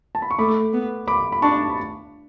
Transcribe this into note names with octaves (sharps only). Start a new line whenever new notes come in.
A5
B5
C#6
A3 B5 D6
B3
B5 D6
B5
D4 A5 C#6
B5